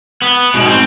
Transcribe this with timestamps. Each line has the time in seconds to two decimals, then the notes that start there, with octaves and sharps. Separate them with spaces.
0.22 B3
0.54 G#2 B2
0.70 C4